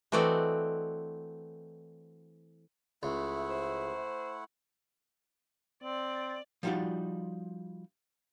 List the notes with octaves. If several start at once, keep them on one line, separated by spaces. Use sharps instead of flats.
E3 A3 C4 F#4 D5 D#5
C#2 A3 E4 E5 F#5
C5
C4 D5
F3 G3 D#4 F4 F#4 D5